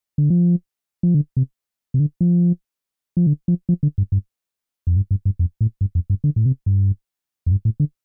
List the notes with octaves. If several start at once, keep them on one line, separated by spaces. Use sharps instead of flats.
D3
F3
F3
D3
C3
C3
D3
F3
F3
D3
F3
F3
D3
G2
G2
F2
G2
G2
G2
F2
A2
G2
F2
G2
D3
A2
C3
G2
F2
G2
A2
D3